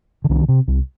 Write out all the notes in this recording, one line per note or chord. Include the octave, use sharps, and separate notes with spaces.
D3
C2 D#3
C3
C2